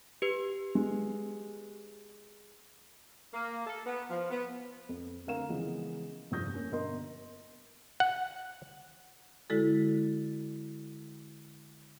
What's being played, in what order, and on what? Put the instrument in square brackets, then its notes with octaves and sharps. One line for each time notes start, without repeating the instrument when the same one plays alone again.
[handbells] G4 B4
[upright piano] G#3
[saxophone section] A#3
A4
B3
F3
B3
[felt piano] F2
D2 C4 A#4 F5 A#5 E7
C#3 E3 F3 G#3 B3
F1 G2 F3 D#6 G6 A#6
A#3 C#4
G1 B2 A#4 D#5 C6
[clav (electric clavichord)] F#5
[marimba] D3 G#3 E4 F#4 A4